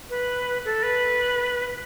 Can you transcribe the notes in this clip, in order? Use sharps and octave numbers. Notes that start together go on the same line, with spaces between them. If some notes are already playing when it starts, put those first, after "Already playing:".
B4
A4
B4